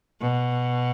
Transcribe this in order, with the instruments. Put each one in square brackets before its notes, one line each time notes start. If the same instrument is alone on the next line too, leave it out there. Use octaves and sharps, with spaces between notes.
[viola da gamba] B2